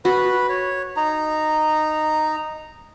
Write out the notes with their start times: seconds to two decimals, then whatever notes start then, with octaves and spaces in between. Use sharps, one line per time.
0.05 F#4 B4 B5
0.49 C#5
0.97 D#4 A#5